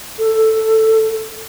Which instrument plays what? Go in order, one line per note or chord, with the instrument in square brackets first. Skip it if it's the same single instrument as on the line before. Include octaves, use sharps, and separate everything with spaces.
[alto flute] A4